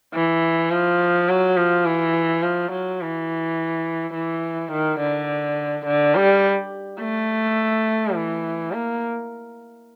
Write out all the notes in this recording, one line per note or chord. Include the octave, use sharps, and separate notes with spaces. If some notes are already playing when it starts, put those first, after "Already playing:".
E3
F3
F#3
F3
E3
F3
F#3
E3
E3
D#3
D3
D3
G3
A3
E3
A#3